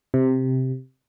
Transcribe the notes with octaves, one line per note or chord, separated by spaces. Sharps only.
C3